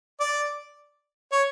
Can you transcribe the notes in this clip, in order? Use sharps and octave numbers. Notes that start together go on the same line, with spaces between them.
D5
C#5